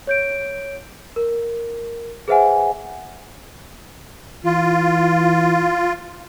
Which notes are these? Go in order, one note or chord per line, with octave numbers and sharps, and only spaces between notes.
C#5 G6 D7
A#4
G#4 B4 C5 E5 F#5 G#5
E3 F4